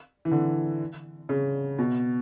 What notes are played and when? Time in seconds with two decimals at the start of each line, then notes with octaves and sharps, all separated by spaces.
0.25 E3
0.31 D3
1.29 C#3
1.79 B2